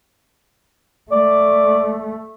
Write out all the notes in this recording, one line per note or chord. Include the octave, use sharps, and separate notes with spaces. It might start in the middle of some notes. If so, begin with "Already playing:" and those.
A3 D5